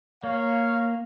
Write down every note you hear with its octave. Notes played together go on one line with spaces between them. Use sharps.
A#3 C#5 F5